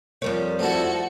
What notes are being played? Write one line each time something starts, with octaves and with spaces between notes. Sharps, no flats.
F2 G3 A#4 C#5
F3 A3 E4 F#4 A4 C#7